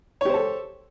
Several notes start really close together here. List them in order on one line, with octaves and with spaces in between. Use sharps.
C#5 G4 C5 A4